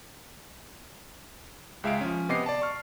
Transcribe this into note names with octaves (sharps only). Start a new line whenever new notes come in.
C#2 G#3 E5 F5 D7
F3 C#4
C3 B3 D#5 D6 C7
D5 A5
C#6 F6